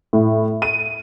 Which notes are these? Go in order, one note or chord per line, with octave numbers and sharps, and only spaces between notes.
A2
D#7